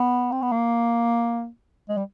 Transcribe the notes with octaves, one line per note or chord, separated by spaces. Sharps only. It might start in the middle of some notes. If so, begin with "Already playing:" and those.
Already playing: B3
C4
B3
A#3
G#3
G3